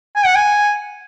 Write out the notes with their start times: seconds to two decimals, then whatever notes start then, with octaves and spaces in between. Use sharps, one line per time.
0.16 G#5
0.25 F#5
0.35 G#5